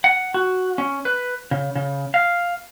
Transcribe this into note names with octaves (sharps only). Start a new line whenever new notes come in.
F#5
F#4
C#4
B4
C#3
C#3
F5